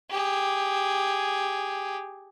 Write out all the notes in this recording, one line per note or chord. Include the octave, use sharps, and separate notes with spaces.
G4 G#4